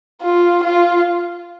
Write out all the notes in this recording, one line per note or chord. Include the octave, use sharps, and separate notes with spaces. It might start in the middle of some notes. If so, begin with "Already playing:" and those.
F4
F4